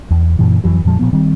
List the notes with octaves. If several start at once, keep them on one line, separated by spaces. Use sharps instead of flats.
E2
F#2 A#2 E3
F2 E3 F#3
F2 A#2 F3 G#3
A#2 F3 B3
D#3 G3 C4